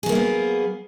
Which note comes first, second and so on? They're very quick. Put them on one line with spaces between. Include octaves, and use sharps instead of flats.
G#4 F#3 A#3 D#4 B3